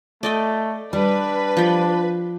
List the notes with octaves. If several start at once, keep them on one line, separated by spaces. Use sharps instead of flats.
A3 D5 D#5 G5
G3 D4 B4
F3 G5 B5